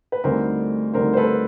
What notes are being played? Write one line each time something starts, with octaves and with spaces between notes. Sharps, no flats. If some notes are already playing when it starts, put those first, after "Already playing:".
B4
D2 D3 G3 C4 D#4 A#4 C5
D2 D3 G3 C4 D#4 A#4 C5
C5
A4 B4